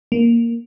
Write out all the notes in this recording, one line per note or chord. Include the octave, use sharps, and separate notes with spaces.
A#3